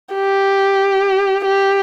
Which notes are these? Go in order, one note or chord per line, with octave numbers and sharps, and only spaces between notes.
G4
G4